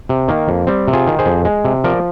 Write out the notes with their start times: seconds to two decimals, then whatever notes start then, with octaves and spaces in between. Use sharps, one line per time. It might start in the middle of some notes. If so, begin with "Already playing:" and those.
0.09 C3
0.28 D#3 A#3
0.48 F2
0.67 G3 C4
0.88 C3
0.93 F4 G#4
1.07 D#3
1.19 G#4 C5
1.26 F2
1.45 G#3
1.65 C3
1.84 F3 A#4 D5